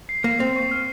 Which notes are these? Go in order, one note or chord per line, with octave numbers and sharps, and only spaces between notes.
C7
A#3 C7
C4 F7
C#6
F6